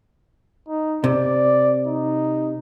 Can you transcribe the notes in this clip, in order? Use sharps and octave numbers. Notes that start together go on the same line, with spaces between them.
D#4
C3 D5
D#4